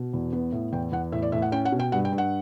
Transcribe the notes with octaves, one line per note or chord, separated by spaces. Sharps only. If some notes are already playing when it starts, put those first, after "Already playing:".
Already playing: B2
E2
B3
A2
E2 G5
E2 F#5
A2 E5
D5
A2 E5
F#5
C#4 G5
F#5
B2
G5
G2 F#5
G5
G2
F#5